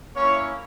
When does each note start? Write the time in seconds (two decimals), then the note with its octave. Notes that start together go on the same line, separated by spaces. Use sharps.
0.16 A#3 C#4 E4 C#5